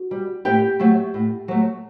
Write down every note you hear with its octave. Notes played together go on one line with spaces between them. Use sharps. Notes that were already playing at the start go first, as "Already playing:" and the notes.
Already playing: F#4
G3
A2 G4 G5
F#3 A3
A2
F#3 A3